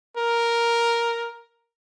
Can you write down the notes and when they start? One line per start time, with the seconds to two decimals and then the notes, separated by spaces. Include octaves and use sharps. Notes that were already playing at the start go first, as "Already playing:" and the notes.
0.17 A#4